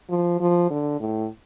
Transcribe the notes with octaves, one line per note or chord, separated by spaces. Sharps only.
F3
F3
D3
A2